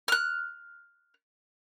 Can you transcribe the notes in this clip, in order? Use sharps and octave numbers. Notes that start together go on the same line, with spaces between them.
F6 F#6